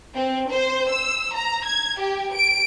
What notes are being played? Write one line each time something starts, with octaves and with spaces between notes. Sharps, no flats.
C4
C5
E6
A#5
G#6
G4
D7